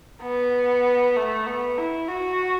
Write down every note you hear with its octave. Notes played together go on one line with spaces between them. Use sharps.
B3
A3
B3
E4
F#4